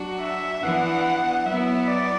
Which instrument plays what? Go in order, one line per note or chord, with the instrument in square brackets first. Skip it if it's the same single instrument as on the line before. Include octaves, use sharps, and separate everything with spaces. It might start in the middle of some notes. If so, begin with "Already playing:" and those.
Already playing: [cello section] F#3 D4 F#4
[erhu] E5
[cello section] E3 B3 D4 [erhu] F#5
[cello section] F#3 B3 E4 [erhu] E5
[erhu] D5